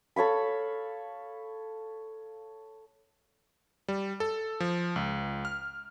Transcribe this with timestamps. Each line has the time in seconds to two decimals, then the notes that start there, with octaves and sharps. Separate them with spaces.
0.16 A4 C#5 F5 B5
3.88 G3
4.20 A4
4.60 F3
4.96 C#2
5.45 F6